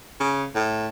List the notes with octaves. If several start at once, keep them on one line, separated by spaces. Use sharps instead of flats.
C#3
A2